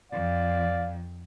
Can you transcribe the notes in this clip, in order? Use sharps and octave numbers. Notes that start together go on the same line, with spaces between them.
F2 D5 F5